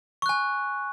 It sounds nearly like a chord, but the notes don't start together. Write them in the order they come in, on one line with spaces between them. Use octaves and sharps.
C#6 F#6 G#5